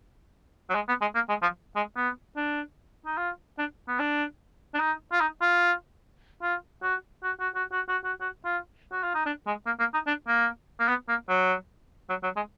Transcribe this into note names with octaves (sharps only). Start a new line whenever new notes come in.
F#3
G#3
B3
G#3
A#3
G#3
F3
G#3
B3
D4
D#4
F4
D4
B3
D4
D4
D#4
F4
D#4
F4
F4
F#4
F#4
F#4
F#4
F#4
F#4
F#4
F#4
F4
F#4
F4
D#4
D4
G#3
A#3
A#3
D#4
D4
A#3
A#3
B3
A#3
F#3
F#3
F#3
G#3